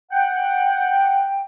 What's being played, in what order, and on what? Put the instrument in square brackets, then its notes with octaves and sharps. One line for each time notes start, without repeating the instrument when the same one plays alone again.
[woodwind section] F#5 G5